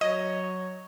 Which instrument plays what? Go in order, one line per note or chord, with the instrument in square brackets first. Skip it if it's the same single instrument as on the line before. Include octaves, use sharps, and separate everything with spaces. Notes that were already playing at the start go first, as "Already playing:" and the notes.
[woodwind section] F#3 C#5 [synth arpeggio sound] D#5